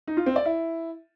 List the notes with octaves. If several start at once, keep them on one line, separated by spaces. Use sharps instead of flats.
D#4
F4
C4
D5
E4